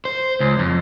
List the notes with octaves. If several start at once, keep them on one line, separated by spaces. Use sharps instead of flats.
C5
C#2
F2